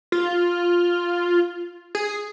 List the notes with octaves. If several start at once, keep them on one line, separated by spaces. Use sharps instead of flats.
F4
G#4